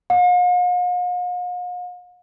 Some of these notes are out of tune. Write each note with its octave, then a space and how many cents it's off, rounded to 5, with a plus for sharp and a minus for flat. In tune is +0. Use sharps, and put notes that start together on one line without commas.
F5 +45